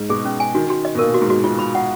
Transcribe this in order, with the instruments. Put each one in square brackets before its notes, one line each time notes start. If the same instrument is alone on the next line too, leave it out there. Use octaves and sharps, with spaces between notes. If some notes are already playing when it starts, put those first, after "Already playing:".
Already playing: [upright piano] G#2
[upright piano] B2 [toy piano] G#4
[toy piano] C#4
G#5
[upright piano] D#3 [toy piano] F#4
[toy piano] F#4
D#5
[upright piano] B2
[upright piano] A#2 [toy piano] A#4
[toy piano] F#4
[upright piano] G#2
[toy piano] F#4
F4
B5
F#5